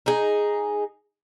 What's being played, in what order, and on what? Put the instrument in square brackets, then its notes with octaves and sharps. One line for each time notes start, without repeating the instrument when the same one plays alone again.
[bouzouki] D#4 G#4